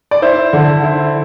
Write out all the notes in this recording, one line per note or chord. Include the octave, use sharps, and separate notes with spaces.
D5
E4 C5
D3
E4